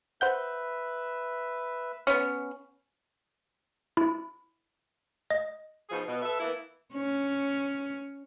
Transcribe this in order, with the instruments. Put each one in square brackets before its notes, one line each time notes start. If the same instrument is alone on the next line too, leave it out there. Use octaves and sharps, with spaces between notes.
[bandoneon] B4 E5 [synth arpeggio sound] C5 F#5 G6
[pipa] B3 C#4
[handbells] E4
D#5
[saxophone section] B2 F3 B3 D#4 G#4
B2
A4 B4 E5
E3 A#3 B3 E4
[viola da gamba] C#4